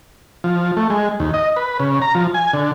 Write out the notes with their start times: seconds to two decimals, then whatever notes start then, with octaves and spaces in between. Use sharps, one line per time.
0.44 F3
0.77 A3
0.90 G#3
1.20 D#2
1.34 D#5
1.56 B4
1.80 C#3
2.02 A#5
2.15 F3
2.34 G#5
2.54 D3